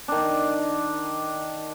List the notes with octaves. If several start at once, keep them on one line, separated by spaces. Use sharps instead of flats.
D#3 D4